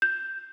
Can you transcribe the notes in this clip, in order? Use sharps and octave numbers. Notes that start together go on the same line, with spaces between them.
G6